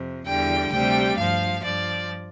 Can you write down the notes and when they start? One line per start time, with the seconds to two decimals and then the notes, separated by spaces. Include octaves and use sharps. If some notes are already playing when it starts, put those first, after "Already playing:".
Already playing: F2 C3
0.26 E2 D3 G3 G5
0.72 D2 C3 G3 G5
1.17 G2 F3 F5
1.63 G2 F3 D5